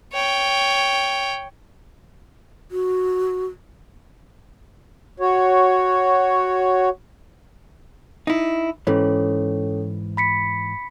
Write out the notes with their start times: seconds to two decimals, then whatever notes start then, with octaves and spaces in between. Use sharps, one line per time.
0.13 C#5 G5
2.71 F#4
5.20 F#4 C#5
8.27 D#4 E4
8.87 G#2 E3 C#4 A4 C#5
10.17 B5 B6 C#7